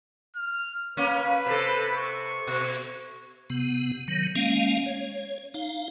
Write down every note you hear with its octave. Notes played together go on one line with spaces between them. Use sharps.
F6
A#3 C#4 B4
C3 A4
C#6
B2
C3 B3
D#3 F#3
G#3 A#3 C#4 F5
C#5
D#4 F5